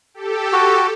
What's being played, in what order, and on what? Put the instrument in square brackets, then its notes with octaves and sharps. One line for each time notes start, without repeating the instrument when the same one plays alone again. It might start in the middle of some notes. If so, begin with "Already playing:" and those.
[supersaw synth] G4 A4
[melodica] F#4